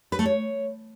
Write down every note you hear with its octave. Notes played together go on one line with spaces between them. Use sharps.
B4
A3
C#5